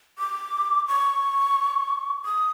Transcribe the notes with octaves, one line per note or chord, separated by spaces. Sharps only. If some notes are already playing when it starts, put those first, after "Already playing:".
D6
C#6
D#6